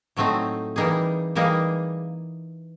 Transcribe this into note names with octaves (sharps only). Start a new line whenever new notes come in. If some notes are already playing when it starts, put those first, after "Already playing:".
A2 F#3 A3 C4 D#4
E3 G3 A#3 D#4 G#4
E3 G3 A#3 D#4 G#4